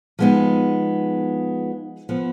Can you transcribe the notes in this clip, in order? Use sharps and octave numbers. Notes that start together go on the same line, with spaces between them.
F3 G#3 B3 D#4
F3 B3